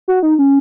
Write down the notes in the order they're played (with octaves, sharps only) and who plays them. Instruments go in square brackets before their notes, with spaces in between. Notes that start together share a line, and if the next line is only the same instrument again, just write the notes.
[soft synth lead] F#4
D#4
C#4